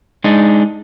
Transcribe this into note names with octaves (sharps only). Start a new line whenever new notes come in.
G#3 D4 D#4